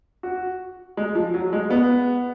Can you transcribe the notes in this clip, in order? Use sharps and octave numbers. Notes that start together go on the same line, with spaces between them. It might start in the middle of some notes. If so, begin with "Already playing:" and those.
F#4
G#3
F3
F#3
G#3
B3